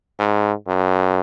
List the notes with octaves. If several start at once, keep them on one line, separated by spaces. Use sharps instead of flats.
G#2
F#2